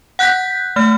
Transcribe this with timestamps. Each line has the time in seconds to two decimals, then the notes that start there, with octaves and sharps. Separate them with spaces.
0.19 F#5 F#6 G6 B6
0.76 A3 F6